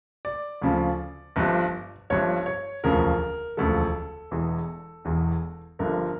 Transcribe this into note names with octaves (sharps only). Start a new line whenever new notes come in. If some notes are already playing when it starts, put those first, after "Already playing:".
D5
D2 C#3 F3
G1 G2 F3
G1 G2 F3 C#5
C#5
E1 D2 C#3 F3 A#4
E1 D2 C#3 F3 A4
E1 E2 E3
E1 E2 E3
G1 G2 D3 F3 A#4